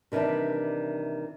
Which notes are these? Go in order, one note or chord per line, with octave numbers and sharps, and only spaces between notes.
C3 D#3 E3 G3 D4